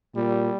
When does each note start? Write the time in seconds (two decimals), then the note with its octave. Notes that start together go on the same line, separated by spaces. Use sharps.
0.16 A#2 G3